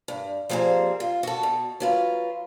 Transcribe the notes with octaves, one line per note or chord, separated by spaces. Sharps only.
G2
F3 G3 A#3 C4 G#4
F4
F#4 A4
B2
F#3 F4 B4